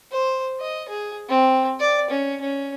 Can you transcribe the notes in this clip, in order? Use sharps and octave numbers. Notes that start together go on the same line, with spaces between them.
C5
D#5
G#4
C4
D5
C#4
C#4